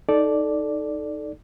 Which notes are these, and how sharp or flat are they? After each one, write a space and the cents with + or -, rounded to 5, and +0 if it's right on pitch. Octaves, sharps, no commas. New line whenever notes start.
D#4 +0 A4 -10 D5 +0